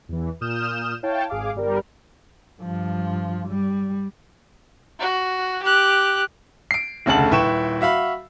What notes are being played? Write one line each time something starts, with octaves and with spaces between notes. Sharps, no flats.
E2 E3
A#2 D#6 F6 G6 E7
E4 C#5 F5 G5 A5
G#1 G#4 F5 D6
G1 G3 A#4
G2 F3
G3
F#4
G4 F#6
C7 D7
F1 D2 C#3 F#5 A5 F#7
D#1 E4 B4 G5 C#6 E7
F#4 E5 F5 B5